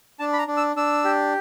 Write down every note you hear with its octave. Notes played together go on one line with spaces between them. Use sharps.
D4 A5
B5
A#5
D4
E6
D4 E6
G4